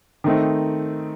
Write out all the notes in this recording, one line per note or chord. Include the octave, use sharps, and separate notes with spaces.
D#3 A3 C4 D#4